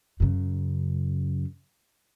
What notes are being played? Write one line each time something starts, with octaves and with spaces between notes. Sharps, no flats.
F#2 C#3